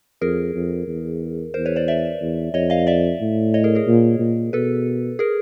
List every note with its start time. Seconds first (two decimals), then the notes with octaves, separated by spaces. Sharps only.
0.21 F2 G#4 A#4
0.54 F2
0.87 E2
1.54 E2 A#4 C5
1.66 B4 C#5
1.76 C5 D5
1.88 D5 E5
2.21 E2
2.53 F2 C#5 D#5
2.70 D#5 F5
2.87 D5 E5
3.21 A2
3.54 C#5 D#5
3.64 G#4 A#4
3.75 G#4 A#4
3.87 A#2
4.19 A#2
4.53 B2 A4 B4
5.19 G#4 A#4